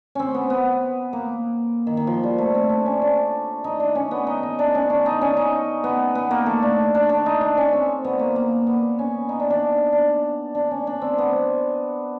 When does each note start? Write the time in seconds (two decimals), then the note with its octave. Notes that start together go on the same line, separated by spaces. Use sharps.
0.15 C4 C#4
0.34 B3
0.50 B3
1.13 A#3
1.87 D#3
1.97 D#3
2.07 F3
2.24 G3
2.38 A3
2.55 C4
2.70 D4
2.86 C#4
3.02 D4
3.64 D#4
3.80 D4
3.95 C#4
4.11 B3
4.27 D#4
4.43 D#4
4.59 D4
4.75 C#4
4.90 D4
5.06 D#4
5.21 C#4
5.37 D#4
5.84 B3
6.15 B3
6.31 A#3
6.46 A3
6.62 D4
6.95 D4
7.09 D4
7.26 D#4
7.41 D4
7.57 C#4
7.73 C4
8.05 B3
8.19 A#3
8.36 A#3
8.67 B3
8.99 C#4
9.29 D#4
9.40 D4
9.50 D4
9.92 D4
10.55 D4
10.71 C#4
10.87 D4
11.02 C4
11.18 B3